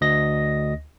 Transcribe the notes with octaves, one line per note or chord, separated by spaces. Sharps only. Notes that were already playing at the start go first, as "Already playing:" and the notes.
D2 D#5 A#6